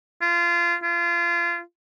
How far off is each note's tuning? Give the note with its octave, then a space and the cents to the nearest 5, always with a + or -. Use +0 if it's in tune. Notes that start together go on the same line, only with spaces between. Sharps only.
F4 -20
F4 -25